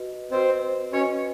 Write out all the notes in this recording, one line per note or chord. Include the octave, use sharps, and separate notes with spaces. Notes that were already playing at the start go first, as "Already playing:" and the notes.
Already playing: F#4 B4 D#5
C4 F#4 B4 C5 D#5
C#4 F#4 B4 C#5 D#5